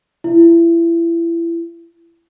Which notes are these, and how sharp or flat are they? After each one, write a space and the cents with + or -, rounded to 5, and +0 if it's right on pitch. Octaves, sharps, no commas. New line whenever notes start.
E4 +30